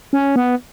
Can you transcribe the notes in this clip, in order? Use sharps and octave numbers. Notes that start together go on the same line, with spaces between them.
C#4
B3